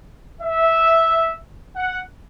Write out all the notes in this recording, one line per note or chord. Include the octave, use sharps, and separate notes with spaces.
E5
F#5